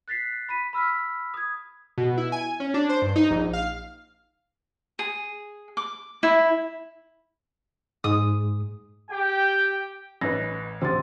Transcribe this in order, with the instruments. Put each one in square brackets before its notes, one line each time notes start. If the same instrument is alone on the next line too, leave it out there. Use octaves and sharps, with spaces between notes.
[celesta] F#6 A6 B6 C7
B5 B6 D#7
B5 E6 F6 B6
D#6 G#6
[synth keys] B2
E4
G#5
C#4
D4
C5
G2
D#4
A#1
F5
[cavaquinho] G#4
D6
E4
[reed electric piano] G#2 G#3 [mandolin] D#6
[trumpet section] G4 G5
[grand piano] A1 [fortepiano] C#4 D#4 B4 [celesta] A#6
[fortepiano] A1 D2 [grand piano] C3 [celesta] C5 C6 A6